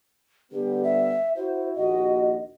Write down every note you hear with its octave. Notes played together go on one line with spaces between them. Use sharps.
D3 G3 B3 G4
E5
E4 F#4 C5
A#1 D#2 F#4 D#5